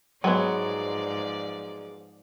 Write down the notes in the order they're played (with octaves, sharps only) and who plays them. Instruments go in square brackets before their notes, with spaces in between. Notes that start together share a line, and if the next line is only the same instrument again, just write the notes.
[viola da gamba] G#2 F3 D5 [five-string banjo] F#3 G#3 B3